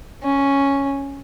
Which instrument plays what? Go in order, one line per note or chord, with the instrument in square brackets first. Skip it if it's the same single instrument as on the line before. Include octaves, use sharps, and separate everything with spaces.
[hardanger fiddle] C#4